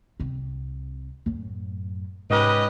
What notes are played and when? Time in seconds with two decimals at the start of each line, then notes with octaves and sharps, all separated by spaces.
0.20 C2 C4
1.26 F#2 A2
2.30 G#2 C3 C#4 G4 B4 D#5